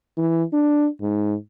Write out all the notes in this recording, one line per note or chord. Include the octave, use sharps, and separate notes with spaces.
E3
D4
G#2